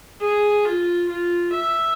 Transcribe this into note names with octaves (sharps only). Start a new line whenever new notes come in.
G#4
F4
F4
E5